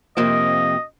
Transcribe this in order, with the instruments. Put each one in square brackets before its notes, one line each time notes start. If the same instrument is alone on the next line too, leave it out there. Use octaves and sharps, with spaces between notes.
[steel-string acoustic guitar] F2 C3 A#3 [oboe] D#5